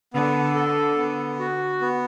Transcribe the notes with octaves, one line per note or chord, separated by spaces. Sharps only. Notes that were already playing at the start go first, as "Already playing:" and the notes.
D3 B3
A4
B3
F#4
B3